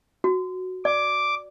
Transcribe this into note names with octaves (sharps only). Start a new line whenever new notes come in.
F#4
D5 D6